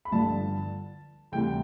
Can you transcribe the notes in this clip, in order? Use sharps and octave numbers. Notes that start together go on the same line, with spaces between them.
B5
G1 G2 D3 F3 A5
D2 C3 E3 G3 G5